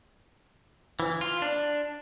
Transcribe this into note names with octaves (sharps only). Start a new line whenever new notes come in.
E3
F4
D4